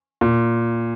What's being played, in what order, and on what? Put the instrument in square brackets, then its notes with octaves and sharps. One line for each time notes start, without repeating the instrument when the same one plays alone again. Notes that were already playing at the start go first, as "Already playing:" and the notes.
[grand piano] A#2